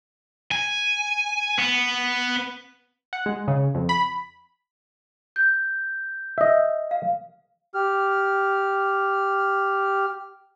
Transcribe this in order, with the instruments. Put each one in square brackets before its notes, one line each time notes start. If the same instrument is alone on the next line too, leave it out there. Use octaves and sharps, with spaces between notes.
[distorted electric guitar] G#5
B3
[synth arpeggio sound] F#5
G#3
C#3
F2
B5
[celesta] G6
[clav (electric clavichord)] D#5 E5
[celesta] F5
[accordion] G4 F6